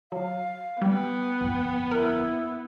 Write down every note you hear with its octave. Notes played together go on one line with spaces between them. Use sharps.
F#3 F5
G3 B3 G5
G1 F2
E4 A#4